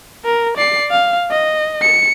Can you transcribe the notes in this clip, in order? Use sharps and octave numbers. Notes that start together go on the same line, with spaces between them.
A#4
D5 C7
F5
D#5
C#7